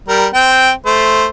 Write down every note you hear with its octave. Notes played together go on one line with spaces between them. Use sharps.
G3 A#4
C4 G5
A3 C5